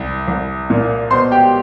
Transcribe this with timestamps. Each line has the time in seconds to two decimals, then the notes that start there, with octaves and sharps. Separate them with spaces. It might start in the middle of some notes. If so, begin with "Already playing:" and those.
Already playing: C2
0.28 C2
0.70 A#2
1.11 B2 C5 C6
1.32 G4 G5